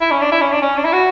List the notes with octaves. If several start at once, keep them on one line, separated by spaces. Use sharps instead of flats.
E4
C#4
D4
E4
C#4
D4
C#4
D4
E4
F#4